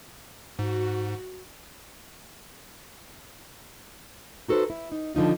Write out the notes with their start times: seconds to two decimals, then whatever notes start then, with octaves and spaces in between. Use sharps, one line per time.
0.59 G#2 F#4
4.48 D#4 F#4 A4 B4 C5
4.70 E4
4.92 D#4
5.15 D3 F3 D#4 F4